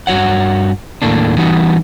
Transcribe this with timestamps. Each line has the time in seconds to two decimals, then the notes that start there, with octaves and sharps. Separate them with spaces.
0.07 G2 F#4 C#5 F#5
1.02 D#2 A2 A3 A#3 D4
1.38 E3 G3 B3 D#4 F#4